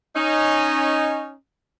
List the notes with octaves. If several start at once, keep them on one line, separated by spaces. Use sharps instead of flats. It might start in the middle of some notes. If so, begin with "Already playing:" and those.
C#4 D#4